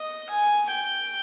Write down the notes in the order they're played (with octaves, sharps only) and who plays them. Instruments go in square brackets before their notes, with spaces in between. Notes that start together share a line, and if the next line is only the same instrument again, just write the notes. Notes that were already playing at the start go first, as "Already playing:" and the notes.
Already playing: [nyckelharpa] D#5
G#5
G5